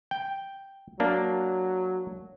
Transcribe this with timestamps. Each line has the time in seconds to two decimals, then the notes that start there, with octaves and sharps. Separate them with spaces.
0.11 G5
1.00 F#3 A#3 D4